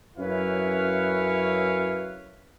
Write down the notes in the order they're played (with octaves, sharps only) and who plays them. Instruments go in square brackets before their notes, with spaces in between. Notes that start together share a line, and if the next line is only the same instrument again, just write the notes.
[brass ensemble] F#2 C#4 E4 B4 C#5 F5